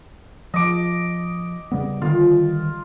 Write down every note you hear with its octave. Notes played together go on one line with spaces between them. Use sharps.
F3 D#5 D6
C#3 G3 B3
D3 D#3 G3 F4